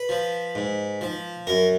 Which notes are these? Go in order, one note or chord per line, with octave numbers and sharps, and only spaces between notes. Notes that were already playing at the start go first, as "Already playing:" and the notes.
Already playing: B4
F3
G#2
F3
F#2 A#4